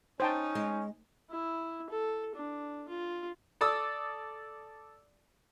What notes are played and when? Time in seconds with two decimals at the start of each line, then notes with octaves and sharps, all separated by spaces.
0.20 C#4 D#4 C5 G5 A5
0.55 G#3
1.31 E4
1.90 A4
2.36 D4
2.89 F4
3.61 A4 D5 D#6 E6